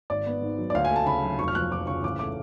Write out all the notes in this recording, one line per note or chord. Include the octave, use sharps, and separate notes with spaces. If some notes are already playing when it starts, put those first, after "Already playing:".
G#1 D5
B3
G#2
F#3
D5
D2 F5
G#5
A3
A5
C#3 B5
F#3
F1 C#6
F6
F3 F#6
F2 D6
C#3 C#6
A1 D6
A3 D6